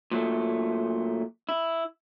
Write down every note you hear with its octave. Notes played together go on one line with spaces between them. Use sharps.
A#2 F#3 A3
E4